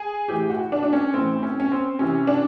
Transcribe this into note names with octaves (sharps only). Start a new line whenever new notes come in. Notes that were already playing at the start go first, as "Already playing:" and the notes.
Already playing: G#4
A2 E3 G4
F#4
D4
D4
C#4
A2 E3 C4
C#4
C#4
C4
C3 E3 C#4
D4